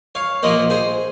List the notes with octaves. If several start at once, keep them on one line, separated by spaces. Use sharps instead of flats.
C#5 F5
A#2 F3 A#3 C5 D#5
G#4 C5